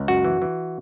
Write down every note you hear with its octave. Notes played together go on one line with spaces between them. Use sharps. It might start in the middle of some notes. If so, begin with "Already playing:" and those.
Already playing: C#2
F#2 F#4
E3
E3